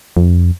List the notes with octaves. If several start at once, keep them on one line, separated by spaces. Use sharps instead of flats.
F2